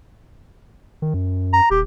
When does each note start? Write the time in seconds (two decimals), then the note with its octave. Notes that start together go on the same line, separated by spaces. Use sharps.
1.02 D#3
1.14 F#2
1.53 A#5
1.70 D#1 G4